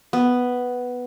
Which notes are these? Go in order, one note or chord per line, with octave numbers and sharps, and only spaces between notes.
B3